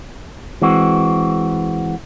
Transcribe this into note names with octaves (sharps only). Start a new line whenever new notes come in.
E3 G#3 C4 F#4